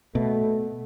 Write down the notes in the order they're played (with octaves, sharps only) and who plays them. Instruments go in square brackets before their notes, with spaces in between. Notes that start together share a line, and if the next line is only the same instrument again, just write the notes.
[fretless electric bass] B2 [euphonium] A3